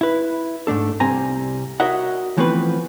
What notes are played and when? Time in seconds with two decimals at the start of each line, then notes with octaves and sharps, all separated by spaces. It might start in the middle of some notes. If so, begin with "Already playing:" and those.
0.01 E4 B4
0.67 G#2 A3 D4 A4
1.00 C2 G3 C4 G#5 A#5
1.80 F#4 A#4 C#5 D#5 E5 F#5
2.38 E3 F3 A3 B3 C4 B4